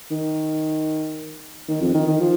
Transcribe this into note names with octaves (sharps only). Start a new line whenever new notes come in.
D#3
D#3
F2
D#3
D#3
F3